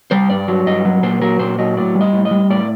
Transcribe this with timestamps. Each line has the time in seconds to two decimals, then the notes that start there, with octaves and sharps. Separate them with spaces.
0.11 G3 C5
0.30 G2 D5
0.48 F#3
0.66 G2 D#5
0.85 F#3
1.03 A#2 C5
1.21 F#3 A#4
1.39 A#2 C5
1.58 F#3 D#5
1.76 A2 D5
1.95 G3
2.01 D#5
2.13 A2
2.25 D#5
2.31 G3
2.50 A2 D5